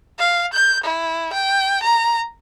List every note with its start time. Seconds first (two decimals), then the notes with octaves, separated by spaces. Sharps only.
0.19 F5
0.53 G6
0.84 E4
1.33 G5
1.83 A#5